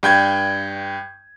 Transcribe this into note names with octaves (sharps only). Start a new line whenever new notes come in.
G2 G5 G6 G#6